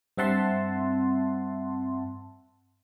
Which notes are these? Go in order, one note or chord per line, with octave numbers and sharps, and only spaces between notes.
G2 C4 E5 F#5 A5 C6